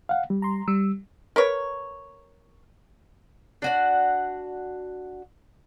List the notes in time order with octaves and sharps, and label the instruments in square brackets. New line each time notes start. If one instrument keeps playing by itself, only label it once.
[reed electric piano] F5 F#5
G3
[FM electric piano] A#5 C6
[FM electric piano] G3 [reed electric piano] E6
[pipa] A#4 B4 C#5
[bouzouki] D4 F#4 F#5